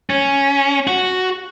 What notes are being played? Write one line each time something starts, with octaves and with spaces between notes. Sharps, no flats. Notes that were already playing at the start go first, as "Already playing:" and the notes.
C#4
F#4